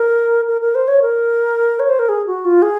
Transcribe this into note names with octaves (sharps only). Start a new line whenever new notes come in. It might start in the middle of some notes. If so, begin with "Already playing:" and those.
Already playing: A#4
A#4
A#4
C5
C#5
A#4
C#5
C5
A#4
G#4
F#4
F4
G#4